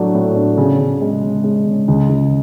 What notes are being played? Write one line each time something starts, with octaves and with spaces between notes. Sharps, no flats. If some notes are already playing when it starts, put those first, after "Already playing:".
Already playing: A2 F#3 A3 D4
A2
D4
C#3
C#3
G#3
C#3
G#3
C#3
C#2
C#2